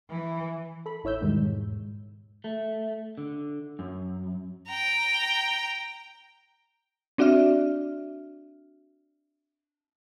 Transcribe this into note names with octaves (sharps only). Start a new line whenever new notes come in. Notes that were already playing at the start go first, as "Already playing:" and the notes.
E3
A4 B5
A1 E4 C#5 E6 G6
E2 G#2 B2 D#3 G3 G#3
G#2
A3
D3
F#2
G5 A#5
C4 D4 F#4 D5 E5 F6